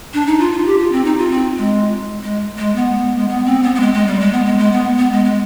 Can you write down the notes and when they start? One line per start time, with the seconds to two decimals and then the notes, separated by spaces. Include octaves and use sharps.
0.14 D4
0.27 D#4
0.40 F4
0.52 F4
0.66 G4
0.79 F4
0.92 C4
1.05 D#4
1.18 F4
1.31 C4
1.58 G#3
2.23 G#3
2.58 G#3
2.76 B3
3.18 G#3
3.28 B3
3.45 C4
3.63 B3
3.75 B3
3.80 G#3
3.94 G#3
4.07 G3
4.20 G#3
4.33 B3
4.46 G#3
4.58 G#3
4.72 B3
4.98 B3
5.12 G#3
5.24 G#3